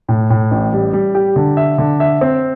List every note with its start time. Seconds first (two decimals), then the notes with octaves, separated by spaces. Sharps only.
0.09 A2
0.30 A2
0.51 A1
0.73 G3
0.93 G3
1.15 G4
1.36 D3
1.57 E5
1.78 D3
2.00 E5
2.21 C4